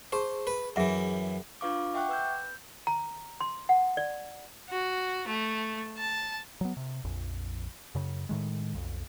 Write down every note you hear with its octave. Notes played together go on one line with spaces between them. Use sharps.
G#4 C5 A5 C#6
B4
F#2 E3 G#4 E5 F#5
D4 F4 B4 F5 C#6 D6
E5 F#5 G5 C#6 D6 F#6
B4 E6 G6
A#5
C6
F#5
D5
F#4
A3
A5
F#3 B3
C3
A#1 F2
F#2 C#3
A2 D#3 G#3
B1 F2